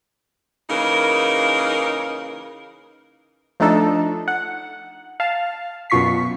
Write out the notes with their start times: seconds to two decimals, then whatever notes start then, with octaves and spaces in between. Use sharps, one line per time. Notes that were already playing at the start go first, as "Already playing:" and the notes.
0.70 C#3 E3 A#3 D#4 A#4
3.60 F3 A3 D4 D#4 A4
4.28 F#5
5.20 F5 A5
5.90 F#2 B2 F4 C#6 B6 C7